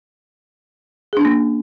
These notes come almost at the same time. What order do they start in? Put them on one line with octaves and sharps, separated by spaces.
G#4 D4 C#4 A#3